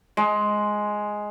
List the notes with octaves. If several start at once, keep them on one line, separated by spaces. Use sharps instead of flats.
G#3